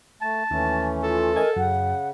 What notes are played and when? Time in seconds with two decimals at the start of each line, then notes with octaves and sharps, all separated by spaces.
0.22 A3 A5
0.51 D#2 E3 A3 C#4
1.03 F4 A4
1.35 A#4 D#5 G#5 A5
1.56 F#2 C#3 F#5